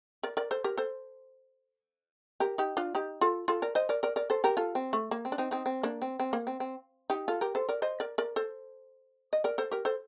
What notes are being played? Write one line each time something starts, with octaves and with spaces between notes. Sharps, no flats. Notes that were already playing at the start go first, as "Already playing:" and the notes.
A#4 D5
A#4 D5
A4 C5
G4 A#4
A4 C5
G4 A#4
D#4 G4
D4 F4
D#4 G4
F4 A4
F4 A4
A#4 D5
C5 D#5
A#4 D5
A#4 D5
A#4 D5
A4 C5
G4 A#4
F4 A4
C4
A3
A#3
C4
D4
C4 D#4
C4 D#4
C4
A#3 D4
C4
C4
A#3
C4
C4
D#4 G4
F4 A4
G4 A#4
A4 C5
A#4 D5
C5 D#5
A#4 D5
A#4 D5
A4 C5
D#5
A#4 D5
A4 C5
G4 A#4
A4 C5